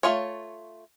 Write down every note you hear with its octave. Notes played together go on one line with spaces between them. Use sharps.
A3 C#4 F4 C#5